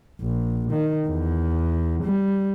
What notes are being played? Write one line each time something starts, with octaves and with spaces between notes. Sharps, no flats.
A#1
D#3
E2
G3